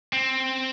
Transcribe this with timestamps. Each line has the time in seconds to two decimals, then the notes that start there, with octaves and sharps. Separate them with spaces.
0.13 C4